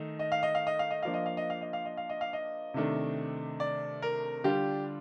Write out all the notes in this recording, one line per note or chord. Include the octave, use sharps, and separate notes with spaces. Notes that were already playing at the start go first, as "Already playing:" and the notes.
Already playing: D#3 A3 D#4
D#5
F5
D#5
F5
D#5
F5
D#5
F3 A#3 D4 F5
D#5
F5
D#5
F5
D#5
F5
D#5
F5
D#5
F5
D#5
C3 D#3 A3 D4
D5
A#4
D3 G3 D4 F4 G4